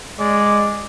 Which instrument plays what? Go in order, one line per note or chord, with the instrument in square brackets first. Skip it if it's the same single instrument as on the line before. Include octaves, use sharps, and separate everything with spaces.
[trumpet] G#3 [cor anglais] D5